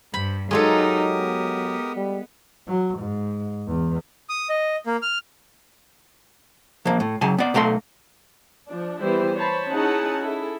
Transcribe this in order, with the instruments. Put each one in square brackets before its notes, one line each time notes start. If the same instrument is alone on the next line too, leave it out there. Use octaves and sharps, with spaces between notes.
[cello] G2 [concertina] C5 [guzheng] B5
[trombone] F#3 [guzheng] G#3 F4 A4 [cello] D#4 [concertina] G4 A#4 D#6
[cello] B3
[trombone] G3
[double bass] F#3
G#2
E2
[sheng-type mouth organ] D#6
D#5
A#3
F6
[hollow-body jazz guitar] F3 A#3
A2
C#3 F#3 G#5 A5
B3 D5
B1 A3 A#4 F5 C6
[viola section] F3 D4
E3 G3 B3 E4 G4 C5
C5 C#5 A5 B5
C#4 D#4 E4 G#4 F#5 A5
E4 G#4 A4